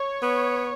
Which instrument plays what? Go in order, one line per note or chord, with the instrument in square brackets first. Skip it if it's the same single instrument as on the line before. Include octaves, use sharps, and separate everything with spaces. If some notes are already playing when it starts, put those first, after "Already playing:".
Already playing: [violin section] C#5
[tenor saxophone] B3